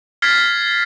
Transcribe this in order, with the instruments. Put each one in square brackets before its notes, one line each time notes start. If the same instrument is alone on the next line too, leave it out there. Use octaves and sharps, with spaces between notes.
[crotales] F6 G#6 A6 B6 C7